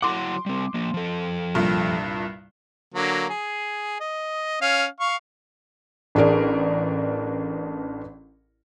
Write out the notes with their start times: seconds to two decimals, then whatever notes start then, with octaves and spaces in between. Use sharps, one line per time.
0.02 F#3 E4 F#5 C6 D6
0.46 G3 C4
0.74 F3 A#3
0.94 F3 A4
1.55 C2 G2 A#2
2.94 D3 F#3 A#3
3.30 G#4
4.01 D#5
4.61 C#4 F5
5.00 F5 C#6
6.15 A1 D4 G#4 A#4 D5